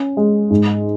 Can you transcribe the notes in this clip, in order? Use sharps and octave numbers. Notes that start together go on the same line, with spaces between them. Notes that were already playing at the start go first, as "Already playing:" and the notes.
Already playing: C#4
G#3
G#2